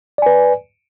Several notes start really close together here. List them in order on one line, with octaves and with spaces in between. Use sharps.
D5 G#5 B4